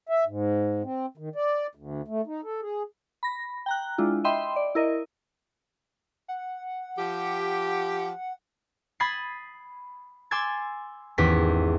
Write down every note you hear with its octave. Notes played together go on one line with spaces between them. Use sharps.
E5
G#2
C4
D#3
D5
D2
A3
D#4
A4
G#4
B5 A#6
G5 A#5 F#6
G#3 D4 E4 F4
D#5 E5 G5 B5 C6
D5
E4 A#4 D#5
F#5
F3 G4
B5 D#6 G#6 A6 C7
G#5 C6 D6 E6 G#6 A6
G#1 E2 C#4 G4 B6